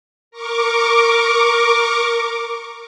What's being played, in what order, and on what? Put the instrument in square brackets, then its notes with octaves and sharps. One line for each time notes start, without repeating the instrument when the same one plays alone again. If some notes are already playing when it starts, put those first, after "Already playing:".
[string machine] A#4 C#6 D6